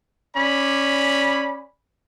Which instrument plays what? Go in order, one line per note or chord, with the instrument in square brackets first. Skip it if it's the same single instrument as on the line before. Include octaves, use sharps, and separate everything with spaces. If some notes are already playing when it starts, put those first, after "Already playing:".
[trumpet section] C#4 D5 B5